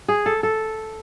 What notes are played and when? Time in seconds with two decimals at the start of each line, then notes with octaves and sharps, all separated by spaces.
0.08 G#4
0.26 A4
0.43 A4